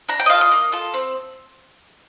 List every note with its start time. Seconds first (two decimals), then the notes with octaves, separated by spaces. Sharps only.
0.09 D4 A#5
0.20 G5
0.26 D#5
0.30 F4 A4 F5
0.41 D#5
0.52 A#3
0.72 F4 A4
0.94 C4